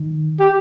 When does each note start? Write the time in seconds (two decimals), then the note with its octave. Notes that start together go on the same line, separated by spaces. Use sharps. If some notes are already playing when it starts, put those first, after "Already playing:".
Already playing: D#3
0.40 G4